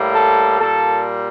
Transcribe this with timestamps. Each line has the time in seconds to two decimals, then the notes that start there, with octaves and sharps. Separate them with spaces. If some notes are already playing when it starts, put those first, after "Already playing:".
Already playing: A2 G3 A#3
0.15 A4
0.60 A#2 G3 A#3 A4